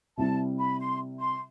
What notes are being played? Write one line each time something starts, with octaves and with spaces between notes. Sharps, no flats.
C3 G3 C4 E4 A5
B5
C6
C6